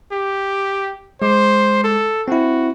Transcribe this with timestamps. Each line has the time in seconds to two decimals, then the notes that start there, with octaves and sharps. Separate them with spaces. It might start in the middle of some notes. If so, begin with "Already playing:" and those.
0.12 G4
1.22 G#3 C5 D6
1.84 A4
2.28 C4 E4 F#4